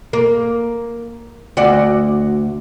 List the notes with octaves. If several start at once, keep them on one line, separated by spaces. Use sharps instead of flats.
A#3
D2 F#4 D5